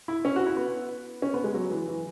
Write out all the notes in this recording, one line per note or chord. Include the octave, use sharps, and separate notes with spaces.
E4
C#4
F#4
E4
B3
C#4
B3
G#3
F#3
E3
E3